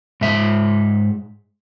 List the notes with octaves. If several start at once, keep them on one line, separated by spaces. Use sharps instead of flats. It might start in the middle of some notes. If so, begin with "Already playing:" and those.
G#2 E5